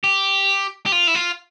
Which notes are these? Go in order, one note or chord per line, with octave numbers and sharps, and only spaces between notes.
G4
G4
F4
E4
F4